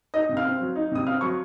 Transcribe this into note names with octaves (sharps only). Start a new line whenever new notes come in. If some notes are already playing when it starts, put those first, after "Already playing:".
D#4 D#5 D#6
C3
F5 F6
C4
F#3
D#4
C3 D#6
C4 F5 F6
F#3 C#6